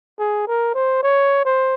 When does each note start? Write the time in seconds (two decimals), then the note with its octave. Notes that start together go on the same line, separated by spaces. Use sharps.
0.19 G#4
0.47 A#4
0.74 C5
1.03 C#5
1.45 C5